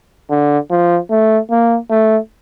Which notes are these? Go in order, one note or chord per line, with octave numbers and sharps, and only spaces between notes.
D3
F3
A3
A#3
A3